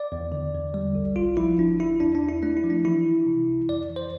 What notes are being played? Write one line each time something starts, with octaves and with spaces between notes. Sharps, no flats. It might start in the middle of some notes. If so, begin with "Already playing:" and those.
Already playing: D5
E2
D3
E2
G3
B1
G1 F4
F3 E4
G1 D4
G1 E4
E2 D4
D4
E2
E4
A3 D4
E4
F3
D4
E3 E4
E3
C3
C2
F2 D5
E3
C5